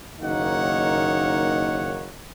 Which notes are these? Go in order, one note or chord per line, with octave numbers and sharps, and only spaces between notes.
F#1 D#3 A#3 D#4 C#5 F#5